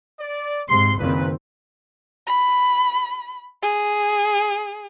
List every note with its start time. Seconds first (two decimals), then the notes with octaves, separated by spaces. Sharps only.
0.20 D5
0.69 G#2 C3 C6
0.98 F#1 A#2 D#3 C4 B4
2.26 B5
3.62 G#4